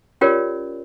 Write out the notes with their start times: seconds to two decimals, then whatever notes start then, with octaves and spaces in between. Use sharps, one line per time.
0.21 C#4 F4 G4 A#4 C#5 D5